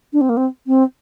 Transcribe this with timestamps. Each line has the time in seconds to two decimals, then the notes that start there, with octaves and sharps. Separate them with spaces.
0.13 D4
0.21 C4
0.29 A#3
0.37 C4
0.67 C4